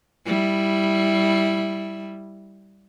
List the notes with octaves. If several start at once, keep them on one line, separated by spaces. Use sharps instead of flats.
G3 E4